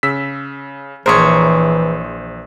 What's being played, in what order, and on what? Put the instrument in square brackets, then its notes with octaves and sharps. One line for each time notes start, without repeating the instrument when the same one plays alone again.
[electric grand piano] C#3 E6 B6
[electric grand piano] A#1 C5 [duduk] E3 [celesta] G#4 C6 D#6 [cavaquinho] A#4 C#5